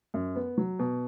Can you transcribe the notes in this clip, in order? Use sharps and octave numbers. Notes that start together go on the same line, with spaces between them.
F#2
B3
F#3
B2